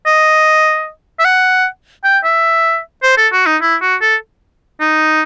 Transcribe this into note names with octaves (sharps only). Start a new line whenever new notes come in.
D#5
E5
F#5
G5
E5
C5
A4
F#4
D#4
E4
F#4
A4
D#4